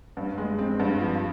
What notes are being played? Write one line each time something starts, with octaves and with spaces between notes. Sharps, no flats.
G2
G#3
C4
G2
F3